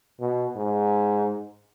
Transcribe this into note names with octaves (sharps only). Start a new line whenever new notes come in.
B2
G#2